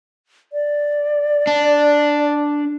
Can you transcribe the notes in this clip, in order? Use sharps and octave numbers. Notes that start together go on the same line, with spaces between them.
D5
D4